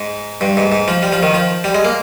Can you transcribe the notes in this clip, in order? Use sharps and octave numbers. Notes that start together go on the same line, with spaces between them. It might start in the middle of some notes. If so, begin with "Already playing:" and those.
Already playing: G#2
G2
G#2
G#2
F3
G3
F3
D#3
F3
G3
G#3
A#3